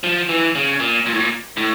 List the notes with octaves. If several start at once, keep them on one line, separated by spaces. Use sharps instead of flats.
F3
E3
C#3
A#2
A#2
A2
A#2
A2